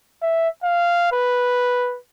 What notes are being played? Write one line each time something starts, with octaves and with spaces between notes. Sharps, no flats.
E5
F5
B4